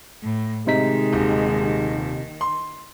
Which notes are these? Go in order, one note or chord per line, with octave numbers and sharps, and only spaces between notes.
A2
C3 D#3 G#3 D#4 B6
D#1
C6